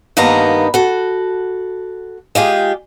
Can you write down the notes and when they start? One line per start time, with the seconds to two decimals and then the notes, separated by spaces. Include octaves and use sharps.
0.17 G2 D#3 A#3 B3 D#4 A#5
0.74 F#4 A4
2.35 G#3 F4 G4 G#4